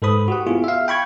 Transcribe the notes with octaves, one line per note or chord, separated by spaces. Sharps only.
G#2 A4 B4 C5 B5 D#6
F#4 G4 F#5
B3 E4 F4 G#4
E5 F5
G5 B5 C#6 G#6